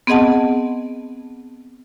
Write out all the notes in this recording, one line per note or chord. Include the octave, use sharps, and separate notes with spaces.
B3 C4 G#4 D#5 F#5 A5